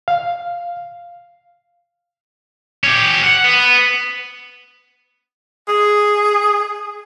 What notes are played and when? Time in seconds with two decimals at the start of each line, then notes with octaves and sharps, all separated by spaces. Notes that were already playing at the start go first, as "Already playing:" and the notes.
0.08 F5
2.84 C#4 G4
3.24 F#5
3.44 B3
5.68 G#4